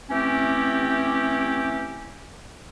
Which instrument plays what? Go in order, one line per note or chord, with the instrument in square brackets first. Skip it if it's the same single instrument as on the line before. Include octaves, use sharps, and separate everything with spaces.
[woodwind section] E3 A3 C4 C#4 G4